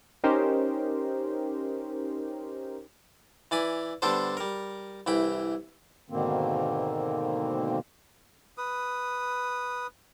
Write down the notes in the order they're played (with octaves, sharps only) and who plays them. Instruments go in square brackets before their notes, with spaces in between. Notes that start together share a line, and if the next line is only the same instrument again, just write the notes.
[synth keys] C#4 D#4 G4 A#4 C5
[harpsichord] E3 D5 G#5 B5
D3 G3 B3 D4 A4 C5
G3 A#4
C2 E3 G5 B5
[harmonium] G#2 B2 D3 D#3 A#3 C4
[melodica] B4 D#6